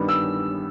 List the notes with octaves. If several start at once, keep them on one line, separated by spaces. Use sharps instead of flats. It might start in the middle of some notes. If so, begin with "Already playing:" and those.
Already playing: G2 D#3 G3 B3
E6